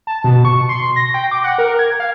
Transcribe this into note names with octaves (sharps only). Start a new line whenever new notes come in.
A5
B2
C#6
C6
A#6
G5
D6
F#5
A#4
G#6
F5